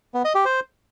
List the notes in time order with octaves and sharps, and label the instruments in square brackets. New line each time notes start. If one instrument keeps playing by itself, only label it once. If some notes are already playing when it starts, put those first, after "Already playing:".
[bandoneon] B3
D#5
G4
C5